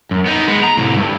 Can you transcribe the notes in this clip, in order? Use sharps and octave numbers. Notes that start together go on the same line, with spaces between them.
F#2
B3 D#4
G#3 B3
A#5
C2 A2
G2